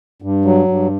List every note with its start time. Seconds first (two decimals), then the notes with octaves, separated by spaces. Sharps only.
0.22 G2
0.45 F#3
0.68 G2